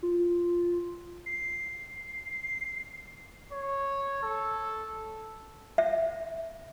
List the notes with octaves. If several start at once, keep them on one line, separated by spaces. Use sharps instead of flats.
F4
C7
C#5
A4
E5